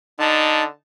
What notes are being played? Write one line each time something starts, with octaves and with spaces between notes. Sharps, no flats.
D3 D#4 A5